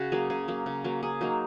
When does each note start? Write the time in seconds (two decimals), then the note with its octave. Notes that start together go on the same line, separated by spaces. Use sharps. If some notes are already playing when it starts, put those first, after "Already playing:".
Already playing: C#3 F#4
0.12 F#3 A#3 G#4
0.30 C#3 G#4
0.48 F#3 A#3
0.66 C#3
0.84 F#3 A#3
1.03 C#3 G#4
1.21 F#3 A#3 D#4